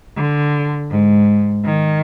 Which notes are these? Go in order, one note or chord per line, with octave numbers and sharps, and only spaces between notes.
D3
G#2
D#3